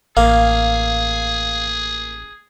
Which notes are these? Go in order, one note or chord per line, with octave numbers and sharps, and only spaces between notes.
A1 A#3 G#4 F5